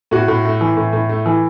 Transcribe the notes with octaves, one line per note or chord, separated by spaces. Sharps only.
A2 F#4
A2
A3
E3
A2
A2
A3
E3